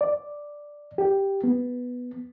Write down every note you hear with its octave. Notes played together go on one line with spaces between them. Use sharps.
D5
G4
B3